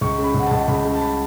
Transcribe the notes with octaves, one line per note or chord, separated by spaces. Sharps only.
C#2 C#6
C#3
B5
C#2
F#5
A5
C#2
C#2 B5
C#3
A5
B5